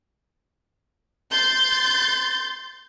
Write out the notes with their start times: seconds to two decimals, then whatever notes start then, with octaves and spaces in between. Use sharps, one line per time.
1.31 C6 G6 A6